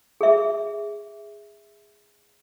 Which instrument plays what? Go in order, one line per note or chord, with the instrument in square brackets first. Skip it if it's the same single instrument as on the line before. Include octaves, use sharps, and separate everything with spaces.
[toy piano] G#4 E5